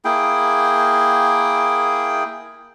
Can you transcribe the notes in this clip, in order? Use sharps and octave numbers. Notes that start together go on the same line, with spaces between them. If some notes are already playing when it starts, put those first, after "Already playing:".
A#3 E4 G#4 G5